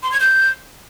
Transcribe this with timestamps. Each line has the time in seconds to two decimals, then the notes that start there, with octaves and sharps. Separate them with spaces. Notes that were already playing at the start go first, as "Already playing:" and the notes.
0.03 C6
0.12 G#6
0.20 G6